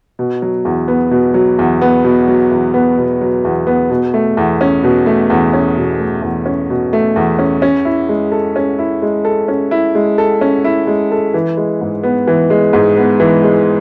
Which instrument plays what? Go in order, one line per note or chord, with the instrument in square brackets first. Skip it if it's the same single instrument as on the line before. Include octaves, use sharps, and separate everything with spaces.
[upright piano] B2
F#3
E2
B3
B2
F#3
E2
B3
B2
F#3
E2
B3
B2
F#3
E2
B3
B2
A3
E2
C#4
B2
A3
E2
C#4
B2
A3
E2
C#4
B2
A3
E2
C#4
C#4
E4
G#3
A4
C#4
E4
G#3
A4
C#4
E4
G#3
A4
C#4
E4
G#3
A4
E3
G#3
G#2
B3
E3
G#3
G#2
B3
E3
G#3